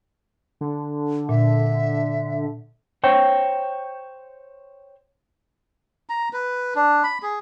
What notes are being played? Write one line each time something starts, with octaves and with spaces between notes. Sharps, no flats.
D3
A#2 E5
C5 C#5 G5
A#5
B4
D4
B5
G#4